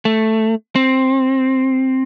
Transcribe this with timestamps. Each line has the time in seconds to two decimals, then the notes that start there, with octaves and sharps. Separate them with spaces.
0.05 A3
0.76 C4